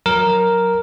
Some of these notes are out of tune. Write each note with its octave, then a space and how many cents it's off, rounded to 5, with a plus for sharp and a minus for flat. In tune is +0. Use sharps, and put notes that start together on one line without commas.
F#3 -10 A#4 +0